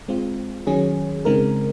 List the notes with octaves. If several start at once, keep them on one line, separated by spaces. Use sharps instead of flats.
G#3 C4 F4
D#3 F#3 C#4 G#4
C#3 G#3 C4 D#4 A#4